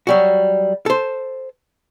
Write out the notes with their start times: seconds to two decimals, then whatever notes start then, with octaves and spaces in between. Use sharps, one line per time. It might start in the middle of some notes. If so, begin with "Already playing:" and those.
0.07 F#3 G3 F#4
0.86 A4 C5